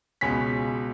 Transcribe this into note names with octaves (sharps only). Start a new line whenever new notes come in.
C#2 B2 G#3 C#4 B6